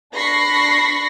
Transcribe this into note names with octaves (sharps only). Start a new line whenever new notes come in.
D4 B5 C#6 A#6 C7